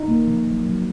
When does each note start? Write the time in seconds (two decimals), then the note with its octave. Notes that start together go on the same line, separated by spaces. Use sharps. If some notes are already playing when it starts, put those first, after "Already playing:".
Already playing: D#4
0.08 A#3
0.28 F3
0.47 F#3
0.66 F#3